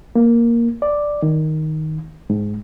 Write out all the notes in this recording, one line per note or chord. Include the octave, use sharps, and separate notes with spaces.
A#3
D5
D#3
G#2